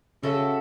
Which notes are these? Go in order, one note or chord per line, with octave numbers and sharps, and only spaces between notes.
C#3 F#4 A4 E5